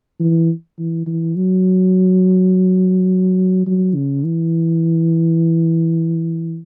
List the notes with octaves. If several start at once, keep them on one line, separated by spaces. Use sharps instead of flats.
E3
E3
E3
F#3
F#3
C#3
E3